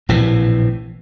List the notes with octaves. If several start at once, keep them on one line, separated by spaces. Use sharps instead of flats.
A#1 A2 C3 E3